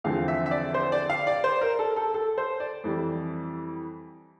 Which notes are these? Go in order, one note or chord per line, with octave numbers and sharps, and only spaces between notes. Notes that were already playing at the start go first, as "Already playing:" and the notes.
E2 D3 F3 C4 F5
E5
E5
D5
C5
D5
F5
D5
C5
A#4
A4
A4
A4
C5
D5
F2 E3 G3